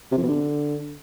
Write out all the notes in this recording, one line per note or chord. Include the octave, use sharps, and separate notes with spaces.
C3
F2
B2
D3